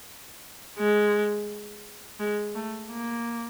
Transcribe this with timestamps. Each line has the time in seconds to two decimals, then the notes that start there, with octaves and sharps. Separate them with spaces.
0.79 G#3
2.20 G#3
2.55 A3
2.91 A#3